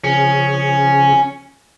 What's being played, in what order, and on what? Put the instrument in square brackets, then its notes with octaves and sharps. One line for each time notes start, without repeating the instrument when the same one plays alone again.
[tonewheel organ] C#3 F3 G#4 [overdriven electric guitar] C#4